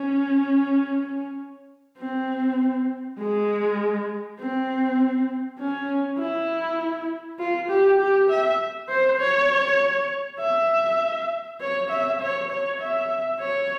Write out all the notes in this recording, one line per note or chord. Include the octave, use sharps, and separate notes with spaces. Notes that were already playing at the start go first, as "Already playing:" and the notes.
Already playing: C#4
C4
G#3
C4
C#4
E4
F4
G4
G4
E5
C5
C#5
E5
C#5
E5
C#5
C#5
E5
C#5